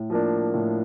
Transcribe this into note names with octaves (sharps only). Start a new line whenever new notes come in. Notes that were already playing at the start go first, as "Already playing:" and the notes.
Already playing: A2
F3 A#3 D4
A2